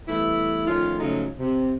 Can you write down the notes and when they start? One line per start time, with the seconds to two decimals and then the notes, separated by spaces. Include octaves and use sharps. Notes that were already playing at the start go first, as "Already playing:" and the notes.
0.08 E3 G3 A3 B3 E4
0.67 D#3 F3 A3 C#4 F4
0.99 C#3 F3 F#3 G#3 A3 D#4
1.39 C3